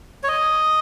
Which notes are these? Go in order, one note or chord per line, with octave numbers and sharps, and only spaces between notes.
C#5
D#5